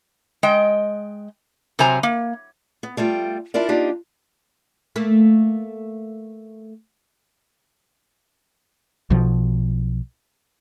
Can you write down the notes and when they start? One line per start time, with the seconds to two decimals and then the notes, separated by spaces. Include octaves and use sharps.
0.43 G#3 D#5 G5
1.79 C3 F#3 C5 G#5 A#5
2.03 A#3
2.83 B3
2.97 G3 A3 F4 G5
3.54 D4 E4 F4 A#4 D5
3.69 A#3 D4 D#4 F4 G4
4.96 A3 A#3
9.10 B1 B2 F3